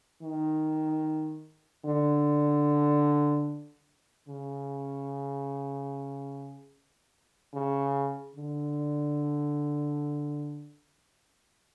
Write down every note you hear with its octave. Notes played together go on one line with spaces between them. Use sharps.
D#3
D3
C#3
C#3
D3